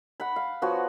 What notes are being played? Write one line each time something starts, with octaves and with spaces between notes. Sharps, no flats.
F#5 B5
F5
F3 B3 F#4 C#5